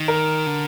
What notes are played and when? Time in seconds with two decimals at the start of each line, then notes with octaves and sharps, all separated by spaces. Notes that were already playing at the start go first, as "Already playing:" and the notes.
Already playing: D#3
0.08 A#4
0.46 D3